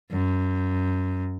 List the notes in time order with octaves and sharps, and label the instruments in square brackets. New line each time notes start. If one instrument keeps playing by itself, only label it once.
[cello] F#2